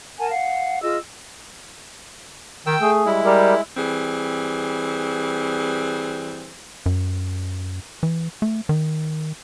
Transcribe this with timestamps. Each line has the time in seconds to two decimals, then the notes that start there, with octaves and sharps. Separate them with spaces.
0.19 A#4 F#5 G#5 A5
0.30 F5 F#5
0.83 F4 G#4 D#5 E6
2.67 D#3 G5 E6
2.81 A3 G#4
3.05 G3 G#3 E4
3.25 G3 G4 A#4
3.77 E3 G3 C4 G#4
6.86 F#2
8.03 E3
8.42 A3
8.69 D#3